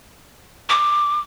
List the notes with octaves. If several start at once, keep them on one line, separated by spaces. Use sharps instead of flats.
D6